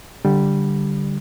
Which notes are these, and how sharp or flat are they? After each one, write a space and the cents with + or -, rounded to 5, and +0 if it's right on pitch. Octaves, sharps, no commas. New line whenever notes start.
D3 +0 G3 +0